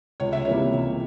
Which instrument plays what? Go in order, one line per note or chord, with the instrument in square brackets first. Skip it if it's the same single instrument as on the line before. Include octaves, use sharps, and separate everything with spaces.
[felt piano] C#2 C#5
E5
C3 E3 G3 A#3 C#5
C#2